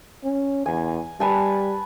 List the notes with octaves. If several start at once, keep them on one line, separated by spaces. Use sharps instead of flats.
C#4
E2 G#5
G3 B4 G#5 A5